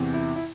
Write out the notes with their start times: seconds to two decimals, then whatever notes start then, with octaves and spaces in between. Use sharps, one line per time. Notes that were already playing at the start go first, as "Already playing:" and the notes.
Already playing: E2 C3 E3
0.14 E4
0.36 E4